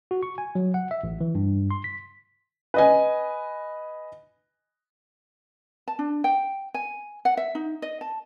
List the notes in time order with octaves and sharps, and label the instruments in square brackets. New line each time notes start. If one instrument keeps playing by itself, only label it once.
[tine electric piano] F#4
C#6
G#5
F#3
F#5
E5
A1
E3
G2
C6
B6
[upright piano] B4 D#5 G#5
[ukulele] A5
D4
G5
G#5
F#5
E5
D#4
D#5
A5